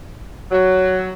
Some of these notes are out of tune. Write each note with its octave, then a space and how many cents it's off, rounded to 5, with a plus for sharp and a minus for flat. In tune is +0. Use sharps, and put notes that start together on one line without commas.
F#3 +10